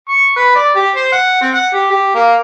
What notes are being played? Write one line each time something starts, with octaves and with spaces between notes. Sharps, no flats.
C#6
B4
D5
G4
C5
F#5
C4
F#5
G4
G4
A#3